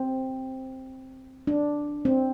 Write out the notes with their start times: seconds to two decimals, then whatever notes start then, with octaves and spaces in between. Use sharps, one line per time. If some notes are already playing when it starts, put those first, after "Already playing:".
Already playing: C4
1.47 D4
2.05 C4